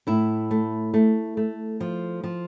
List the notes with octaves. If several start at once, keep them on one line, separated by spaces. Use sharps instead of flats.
A2 E4
A3
A3
A3
F3
F3